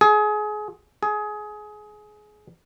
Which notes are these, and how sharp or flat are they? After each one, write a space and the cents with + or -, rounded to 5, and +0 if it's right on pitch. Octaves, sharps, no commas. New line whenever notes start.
G#4 +25
G#4 +20